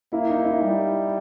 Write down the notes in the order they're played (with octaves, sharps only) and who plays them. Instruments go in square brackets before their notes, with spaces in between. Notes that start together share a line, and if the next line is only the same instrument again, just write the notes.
[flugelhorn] A#3 [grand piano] E4
[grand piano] D#4
E4
[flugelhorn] G3